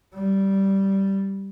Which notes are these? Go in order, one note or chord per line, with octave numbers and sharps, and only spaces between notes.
G3